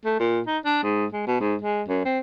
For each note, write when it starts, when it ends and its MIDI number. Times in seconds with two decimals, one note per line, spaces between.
0.05 0.16 57
0.20 0.40 46
0.47 0.58 63
0.65 0.81 62
0.83 1.06 44
1.12 1.25 56
1.27 1.40 47
1.40 1.56 44
1.62 1.83 56
1.88 2.01 42
2.05 2.19 60